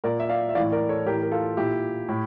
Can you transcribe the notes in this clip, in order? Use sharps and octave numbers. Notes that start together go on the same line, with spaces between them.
A#2 A#4 D5
E5
D5 F5
E5
A2 E3 D5 F5
A#4 D5
A4 C#5
A2 E3 G4 A#4
A#4
F4 A4
A#2 E4 G4
A2